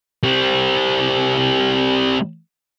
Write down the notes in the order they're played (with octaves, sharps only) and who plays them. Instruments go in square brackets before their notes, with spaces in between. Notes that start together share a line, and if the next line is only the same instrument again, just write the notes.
[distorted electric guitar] G3 C4